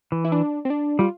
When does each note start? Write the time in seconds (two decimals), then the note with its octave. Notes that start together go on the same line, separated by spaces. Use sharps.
0.12 E3
0.25 E4
0.32 D4
0.65 C4
0.70 D4
0.99 G3 F4